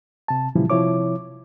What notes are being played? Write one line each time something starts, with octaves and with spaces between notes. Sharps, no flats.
C3 A5
A#2 C#3 E3 F3 G3 E4
C3 F3 E4 C#5 D6